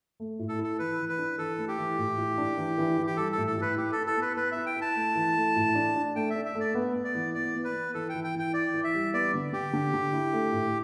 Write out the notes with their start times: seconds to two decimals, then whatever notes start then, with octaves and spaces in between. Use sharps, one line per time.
0.20 A3
0.39 A2
0.49 A4
0.59 E4
0.64 A4
0.79 E3 B4
0.99 E3
1.09 B4
1.18 D4
1.38 E3 A4
1.58 A3
1.68 G4
1.78 E3
1.98 A2
2.18 A2
2.38 D4
2.57 E3
2.78 E3
2.98 E3
3.07 G4
3.17 G3 A4
3.32 A4
3.38 A2
3.47 A4
3.57 A2 B4
3.76 E4 G4
3.92 E4 A4
4.07 A4
4.16 B3
4.22 B4
4.37 B3 B4
4.51 E4 E5
4.66 G5
4.77 E4 A5
4.96 A3
5.15 E3
5.36 A3
5.56 A2
5.75 D4
5.96 D4
6.16 A3 G5
6.30 E5
6.35 D4
6.45 E5
6.55 A3
6.60 D5
6.75 B3
6.95 B3
7.04 D5
7.15 E3
7.34 B3 D5
7.54 B3
7.64 B4
7.74 B3
7.94 E3 A4
8.09 G5
8.14 E3
8.24 G5
8.34 E3 G5
8.54 E4 D5
8.74 E3
8.84 E5
8.94 G3
9.13 B3 D5
9.34 D3
9.53 D3 G4
9.73 D3
9.93 D3
10.13 E4
10.33 A3
10.52 A2